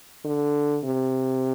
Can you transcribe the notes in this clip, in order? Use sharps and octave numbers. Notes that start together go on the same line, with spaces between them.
D3
C3